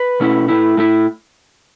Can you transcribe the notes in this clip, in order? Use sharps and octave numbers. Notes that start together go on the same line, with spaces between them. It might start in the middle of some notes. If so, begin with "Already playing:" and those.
Already playing: B4
B2 A3 C#4 E4
A2 A3 E4
A2 A3 E4